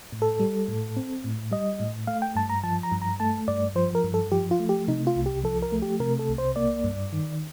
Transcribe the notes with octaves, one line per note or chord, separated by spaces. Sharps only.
A2
A4
G3
A2
C4
A2
G3 D#5
A2
A3 F5
G5
G2 A5
A#5
F3 A5
A#5
G2
A#5
A3 A5
G2 D5
F3 C5
A#4
G2
A4
F3 G4
F4
A3
G4
C3 D#4
F4
C2
G4
F3 A4
A#4
A3
G4
C3 A#4
A4
C2
C5
A#3 D5
G2
D#3